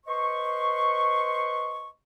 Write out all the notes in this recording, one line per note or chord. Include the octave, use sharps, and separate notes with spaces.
B4 C5 D#5 C6 C#6